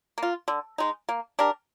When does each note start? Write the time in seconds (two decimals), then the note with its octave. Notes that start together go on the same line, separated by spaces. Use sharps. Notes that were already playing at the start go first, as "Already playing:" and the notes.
0.18 A#3 F4
0.48 D3
0.78 G#3 D#4
1.09 A#3
1.39 D4 G4 A#4